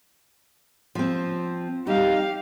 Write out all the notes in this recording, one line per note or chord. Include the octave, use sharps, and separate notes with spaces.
F3 C4
G3 D#4 G4 F5